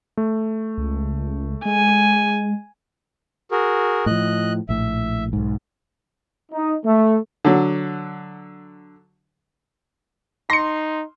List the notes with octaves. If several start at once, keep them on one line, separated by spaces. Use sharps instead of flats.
A3
C#2
G#3 G#5
F#4 G#4 A#4
A2 F3 D#5 F#6
A#1 A2 E5
B1 G#2
D#4
A3
D3 F#3
D#4 C6 A#6 C#7